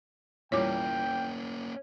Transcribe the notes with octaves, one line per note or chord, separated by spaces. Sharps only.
E2 A#2 G3 A#3 C#4 C#5 G5 D6